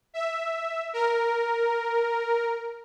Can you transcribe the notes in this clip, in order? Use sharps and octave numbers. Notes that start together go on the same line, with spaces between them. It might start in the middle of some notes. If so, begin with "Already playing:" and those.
E5
A#4